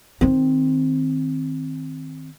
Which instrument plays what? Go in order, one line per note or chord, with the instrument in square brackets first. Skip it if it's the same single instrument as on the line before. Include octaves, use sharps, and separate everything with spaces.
[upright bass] D#3 C4